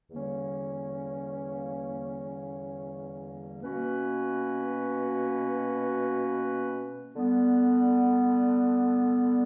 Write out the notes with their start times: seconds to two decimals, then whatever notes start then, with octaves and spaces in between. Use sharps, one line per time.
0.11 E2 D3 G3 A#3 C#4
3.63 B2 A#3 C#4 F#4 B4
7.15 D3 G3 B3